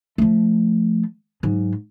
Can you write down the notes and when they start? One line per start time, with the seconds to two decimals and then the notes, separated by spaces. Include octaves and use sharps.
0.18 F3 A3
1.43 G#2 F#3